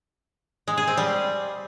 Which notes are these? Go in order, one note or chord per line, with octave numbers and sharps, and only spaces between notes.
G#3
G#4
C4
G3